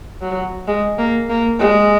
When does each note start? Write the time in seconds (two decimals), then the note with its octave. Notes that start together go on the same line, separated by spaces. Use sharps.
0.21 F#3
0.68 G#3
0.98 A#3
1.30 A#3
1.60 G#3